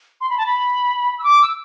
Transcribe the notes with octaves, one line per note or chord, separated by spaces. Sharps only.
C6
B5
A5
B5
E6
D6
E6